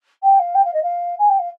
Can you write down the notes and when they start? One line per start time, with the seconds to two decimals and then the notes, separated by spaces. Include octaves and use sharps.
0.23 G5
0.39 F5
0.55 G5
0.65 F5
0.73 D#5
0.83 F5
1.19 G#5
1.29 G5
1.39 F5